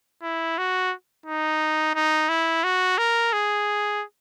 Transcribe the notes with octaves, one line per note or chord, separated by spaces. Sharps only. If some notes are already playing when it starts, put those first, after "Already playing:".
E4
F#4
D#4
D#4
E4
F#4
A#4
G#4